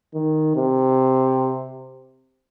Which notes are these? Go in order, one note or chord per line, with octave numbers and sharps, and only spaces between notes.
D#3
C3